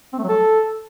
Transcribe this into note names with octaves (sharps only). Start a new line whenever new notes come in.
C4
A3
F#3
A4